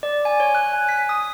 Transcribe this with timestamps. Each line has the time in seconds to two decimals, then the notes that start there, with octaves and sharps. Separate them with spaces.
0.03 D5
0.25 G#5
0.40 C#5
0.55 F#6
0.73 G#5
0.89 B6
1.09 D#6